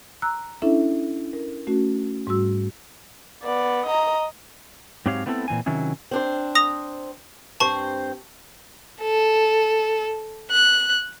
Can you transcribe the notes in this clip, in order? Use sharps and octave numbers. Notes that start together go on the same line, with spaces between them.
A#5 E6 F#6
C#4 D4 E4 A4 E5
A#4
A3 C#4 F#4
G#2 G3 F#4 E6
B3 D5
D#5 A#5
G#2 F#3 C4 G4 C#5 F5
A3 B3 C4 E4 G#4 A4
A#2 E3 C4 G#5
C3 D#3 F#3 C#4 E4
C4 D4 C5
D#6 A#6 F7
G2 C4 C5 A5 C#6
A4
F#6